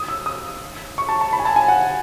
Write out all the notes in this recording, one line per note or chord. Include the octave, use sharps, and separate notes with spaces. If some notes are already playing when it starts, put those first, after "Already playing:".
Already playing: D#6
E6
D#6
C#6
A5
A5
B5
G#5
A5
G#5
F#5